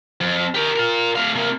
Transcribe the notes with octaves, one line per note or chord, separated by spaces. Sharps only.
F2
G4 A#4
F4 A#4
A3 F5
C3 A#3